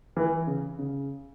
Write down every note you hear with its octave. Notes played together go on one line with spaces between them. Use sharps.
E3
C#3
C#3